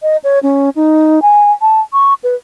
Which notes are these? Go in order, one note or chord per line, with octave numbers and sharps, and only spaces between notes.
D#5
C#5
C#4
D#4
G#5
A5
C#6
B4